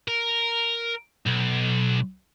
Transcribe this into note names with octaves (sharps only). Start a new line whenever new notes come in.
A#4
B1